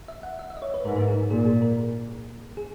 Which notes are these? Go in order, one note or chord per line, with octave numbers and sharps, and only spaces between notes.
E5
F#5
E5
E5
D#5
C#5
B4
G#2 A#4
A#4
G#4
A#2 G#4
G#4
A#4
G#4